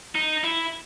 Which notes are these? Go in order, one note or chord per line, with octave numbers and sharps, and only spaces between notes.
D#4
E4